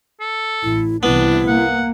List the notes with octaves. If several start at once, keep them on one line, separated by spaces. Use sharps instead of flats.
A4
A1 E4
C2 C3 E3 B3 D4 E4
A#3 F#5